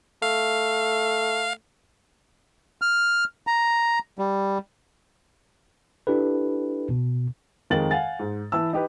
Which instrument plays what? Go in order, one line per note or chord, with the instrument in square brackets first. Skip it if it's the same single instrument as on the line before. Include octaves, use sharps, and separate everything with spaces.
[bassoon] A3 [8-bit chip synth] F5
[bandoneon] F6
A#5
G3
[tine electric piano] D4 E4 G4 A4 B4
B2
[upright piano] F2 D#3 G#3 A#4 A6 F#7
F5 F#5 G#5 A6
G#2
E3 E4 A5 E6
D#4 G4 B4